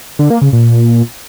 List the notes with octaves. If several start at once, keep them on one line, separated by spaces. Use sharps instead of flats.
D3
A#3
C#3
A#2